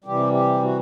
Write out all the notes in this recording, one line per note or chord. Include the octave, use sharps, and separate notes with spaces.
C3 E3 G3 G4
G4
F#4